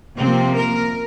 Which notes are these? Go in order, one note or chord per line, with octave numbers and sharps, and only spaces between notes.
C3 F3 A#3 C4
A#4